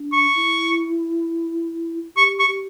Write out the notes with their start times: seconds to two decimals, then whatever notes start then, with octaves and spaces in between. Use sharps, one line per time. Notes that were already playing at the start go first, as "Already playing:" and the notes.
Already playing: D4
0.13 C#6
0.35 E4
2.16 G4 C#6
2.40 C#6
2.47 G4